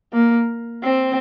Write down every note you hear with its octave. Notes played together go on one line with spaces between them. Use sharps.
A#3
C4